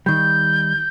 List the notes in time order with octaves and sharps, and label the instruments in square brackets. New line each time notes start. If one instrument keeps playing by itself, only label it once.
[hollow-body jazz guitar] D#3 G3 [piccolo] G6